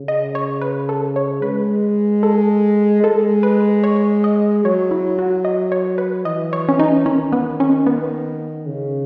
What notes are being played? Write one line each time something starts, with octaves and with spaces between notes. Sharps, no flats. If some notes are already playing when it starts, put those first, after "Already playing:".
Already playing: C#3
D#5
C#5
B4
A4
C#5
G#3 B4
A4
G#3 A4
B4
C#5
D#5
F#3 C#5
E4
F#4
D#5
C#5
B4
E3 D#5
C#5
C#4
D#4
D#3 C#4
B3
C#4
B3
C#3